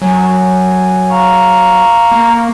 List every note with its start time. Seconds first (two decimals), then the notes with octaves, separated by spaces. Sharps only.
0.02 F#3 G#5
1.10 F5 A#5 C#6
2.12 A#3